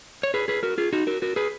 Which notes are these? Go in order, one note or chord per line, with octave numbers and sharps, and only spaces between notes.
C#5
G#4 B4
G#4 B4
F#4 A#4
F4 G#4
D#4 F#4
F#4 A#4
F#4 A#4
G#4 B4